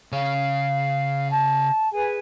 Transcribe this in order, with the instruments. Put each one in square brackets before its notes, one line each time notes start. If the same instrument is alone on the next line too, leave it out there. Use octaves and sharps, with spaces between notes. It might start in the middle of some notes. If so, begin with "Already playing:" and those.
[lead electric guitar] C#3 C#5 [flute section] F5
[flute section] A5
G#4 B4 G#5